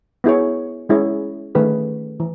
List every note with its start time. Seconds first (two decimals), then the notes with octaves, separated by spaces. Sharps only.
0.24 B3 E4 G#4 C#5
0.89 G#3 C#4 E4 G#4 C#5
1.55 D#3 A3 C#4 G#4 B4
2.20 E3